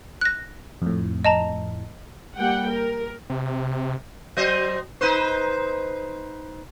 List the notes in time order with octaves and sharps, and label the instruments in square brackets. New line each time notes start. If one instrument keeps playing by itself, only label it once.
[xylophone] F#6 A#6
[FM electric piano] F2 A2
[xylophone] D#5 A5 A#5
[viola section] G3 A#3 F#5 G5
A#4
[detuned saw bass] C3
[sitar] F#3 C5 D#5
D#4 B4 C5